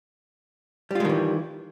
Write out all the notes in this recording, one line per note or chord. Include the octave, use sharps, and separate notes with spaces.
D#3 E3 G3 G#3 F4